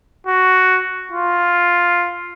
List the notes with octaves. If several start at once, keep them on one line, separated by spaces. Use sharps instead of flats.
F#4
F4